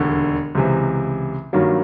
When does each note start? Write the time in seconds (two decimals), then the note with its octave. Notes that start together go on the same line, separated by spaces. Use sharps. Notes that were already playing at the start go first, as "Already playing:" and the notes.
Already playing: E1 D#2 D3
0.55 C#2 C3 E3
1.53 G2 D#3 F#3 A#3